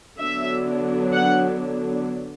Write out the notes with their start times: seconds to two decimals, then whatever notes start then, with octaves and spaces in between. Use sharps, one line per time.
0.19 D3 F#3 B3 D4 E5
1.14 F#5